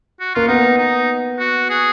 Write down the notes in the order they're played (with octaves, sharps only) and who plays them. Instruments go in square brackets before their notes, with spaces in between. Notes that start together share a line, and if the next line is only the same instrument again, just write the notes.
[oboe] F#4
[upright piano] A#3 [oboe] F4
[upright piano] B3 [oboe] D#4
[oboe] D#4
F#4
G#4